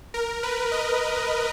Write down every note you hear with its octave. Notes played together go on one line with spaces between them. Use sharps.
A#4
B4
D#5